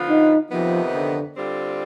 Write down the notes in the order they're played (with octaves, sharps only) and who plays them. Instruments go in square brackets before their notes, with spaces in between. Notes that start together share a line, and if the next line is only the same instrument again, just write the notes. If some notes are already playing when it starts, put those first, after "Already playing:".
Already playing: [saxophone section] D3 F3 B3 F4
[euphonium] D#4
[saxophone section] F2 C3 D#3 B3 D#4 [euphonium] F3
[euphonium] D3
[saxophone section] D3 G3 C4 F4